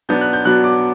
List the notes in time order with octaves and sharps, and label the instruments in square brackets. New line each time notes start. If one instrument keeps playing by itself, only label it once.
[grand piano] B2 F#3 B3 D4 G6
F#6
G6
B2 F#3 B3 D4 F#6
D6